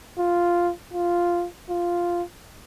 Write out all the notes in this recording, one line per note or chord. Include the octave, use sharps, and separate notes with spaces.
F4
F4
F4